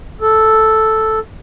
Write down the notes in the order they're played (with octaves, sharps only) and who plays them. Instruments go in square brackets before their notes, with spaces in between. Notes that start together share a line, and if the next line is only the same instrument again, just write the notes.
[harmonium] A4